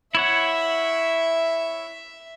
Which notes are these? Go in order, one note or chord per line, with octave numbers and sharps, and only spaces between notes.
E4 C#5 E5 F#5